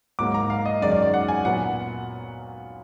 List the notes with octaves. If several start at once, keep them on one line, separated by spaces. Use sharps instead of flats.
G#2 F#3 A#3 D6
A#5
F5
D#5
F#2 D#3 G#3 D5
D5
D5
F#5
G#5
A#2 F#3 B3 F#5